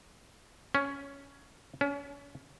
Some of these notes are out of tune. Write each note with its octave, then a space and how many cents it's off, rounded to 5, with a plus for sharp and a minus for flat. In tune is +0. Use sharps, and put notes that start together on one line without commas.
C#4 +10
C#4 +35